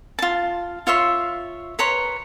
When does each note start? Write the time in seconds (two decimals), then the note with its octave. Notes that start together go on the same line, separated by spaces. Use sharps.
0.19 F4 A5
0.87 F4 C#5 E5 C6
1.79 B4 C#5 A#5 C6